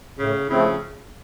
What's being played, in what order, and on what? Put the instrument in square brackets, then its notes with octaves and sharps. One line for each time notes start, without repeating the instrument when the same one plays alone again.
[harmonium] A2 [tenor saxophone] C#3
[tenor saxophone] C#3 [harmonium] F3 A3 C4 E4